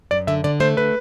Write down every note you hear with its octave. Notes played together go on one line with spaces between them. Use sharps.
F#2 D5
D3 E5
D3 D5
A3 C5
D3 B4